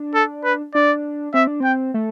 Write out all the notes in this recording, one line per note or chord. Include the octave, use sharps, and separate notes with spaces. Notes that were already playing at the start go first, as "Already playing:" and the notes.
Already playing: D4
A4
B4
D4 D5
C4 E5
D4
C4 G5
A3